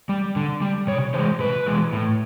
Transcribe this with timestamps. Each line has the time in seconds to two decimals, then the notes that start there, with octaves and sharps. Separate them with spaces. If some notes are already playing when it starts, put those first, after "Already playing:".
0.09 G3
0.36 D3
0.61 G3
0.87 C3 C#5
1.14 E3 G#3 C5
1.39 C3 B4
1.66 E3 G#3
1.93 A2